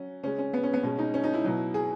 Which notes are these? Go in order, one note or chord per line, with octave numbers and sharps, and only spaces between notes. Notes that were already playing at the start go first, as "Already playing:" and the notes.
Already playing: F#3 C#4
C#3 G#3 C#4
C#4
B3
C#4
B3
B2 G#3 C#4
D#4
C#4
D#4
E4
B2 F#3
G#4